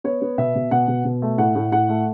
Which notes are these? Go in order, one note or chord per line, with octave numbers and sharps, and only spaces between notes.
B3 C#5
B3
B2 E5
B2
B2 F#5
B2
B2
A3
A2 F#5
A2
A2 F#5
A3